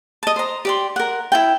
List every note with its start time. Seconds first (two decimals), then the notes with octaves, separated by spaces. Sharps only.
0.23 D#5 A5
0.36 C5 A#5
0.65 G4 D5 C6
0.96 A#4 F#5
1.32 E4 F4 G5